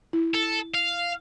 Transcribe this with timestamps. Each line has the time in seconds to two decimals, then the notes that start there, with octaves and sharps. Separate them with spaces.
0.13 E4
0.35 A4
0.75 F5